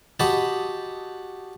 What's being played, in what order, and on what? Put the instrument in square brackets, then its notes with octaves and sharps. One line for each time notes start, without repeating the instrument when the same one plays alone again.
[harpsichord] F#4 G4 D#5 F#5 A5 B5